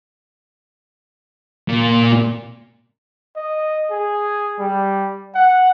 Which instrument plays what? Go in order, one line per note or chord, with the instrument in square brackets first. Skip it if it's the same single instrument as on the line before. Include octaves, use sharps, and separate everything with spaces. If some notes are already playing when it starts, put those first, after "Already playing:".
[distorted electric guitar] A#2
[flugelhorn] D#5
G#4
G3
F#5